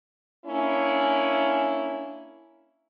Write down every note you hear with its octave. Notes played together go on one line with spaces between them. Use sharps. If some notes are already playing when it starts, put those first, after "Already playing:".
A#3 C#4 D4 E4